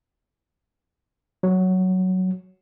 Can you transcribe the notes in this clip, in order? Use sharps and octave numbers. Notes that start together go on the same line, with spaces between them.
F#3